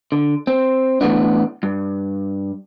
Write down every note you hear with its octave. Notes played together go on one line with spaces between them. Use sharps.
D3
C4
A2 E3 A3 B3 D4
G2